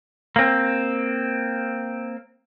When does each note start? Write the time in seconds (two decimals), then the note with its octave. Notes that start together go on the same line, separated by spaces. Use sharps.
0.36 A#3 C4